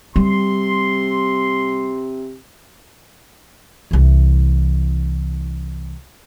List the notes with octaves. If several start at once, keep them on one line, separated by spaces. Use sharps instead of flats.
C3 G3 C6
C2 E3